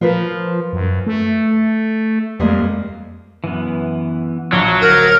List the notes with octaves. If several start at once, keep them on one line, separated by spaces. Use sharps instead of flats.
F3 F4 A#4 B4
F#2
A3
F2 G3 G#3 A#3
F#2 E3 B3
A#1 F#3 A#5 C#6 D6 F6
D1 A#4